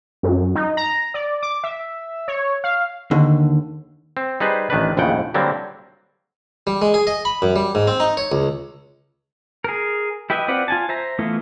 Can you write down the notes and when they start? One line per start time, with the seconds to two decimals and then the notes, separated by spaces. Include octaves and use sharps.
0.23 F#2
0.56 D#4
0.77 A#5
1.14 D5
1.42 D6
1.64 E5
2.28 C#5
2.64 F5
3.11 D#2 D3
4.17 C4
4.40 G3 D#4 G#4 B4 C5
4.70 A1 D#3 D4 B4
4.97 A#1 D#2 A2 C#3 F#5 G5
5.34 D3 F#3 G3 A#3 C4
6.67 G3
6.82 G#3
6.94 G#4
7.07 D#5
7.25 B5
7.42 F#2
7.56 G3
7.75 G#2
7.87 C4
8.00 D#4
8.17 C#5
8.32 C#2
9.64 G#4 A#4
10.30 E4 G4 B4 D#5 E5
10.48 C4 F4 B4 D5 F#5
10.68 F4 G#5 A5
10.89 C5 E5 A#5
11.19 E3 A3 B3 E4 F4